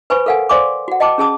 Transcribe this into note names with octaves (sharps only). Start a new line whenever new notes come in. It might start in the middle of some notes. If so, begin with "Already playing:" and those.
B4 C5 G#5 B5 C#6
A4 A#4 F5 F#5 G#5
C5 D5 F5 G#5 C6 D6
F#4 F#5
D#5 G5 A5 D6
C#4 G#4 A5 D#6